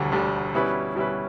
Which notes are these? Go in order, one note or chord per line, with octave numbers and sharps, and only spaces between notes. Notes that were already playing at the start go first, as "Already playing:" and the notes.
Already playing: E1 D2 D3 G3
E1 D2 D3 G3
B2 G3 C#4 E4 B4
B2 G3 C#4 E4 B4